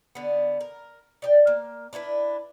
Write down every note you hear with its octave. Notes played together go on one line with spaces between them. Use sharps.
D3 B3
A#4
D5 D#5 G5
A#3
D4 E4 A4 B4